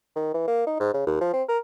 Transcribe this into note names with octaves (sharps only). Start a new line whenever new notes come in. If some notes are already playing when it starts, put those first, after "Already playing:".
D#3
E3
A#3
D#4
G#2
C#3
D#2
F3
C4
A#4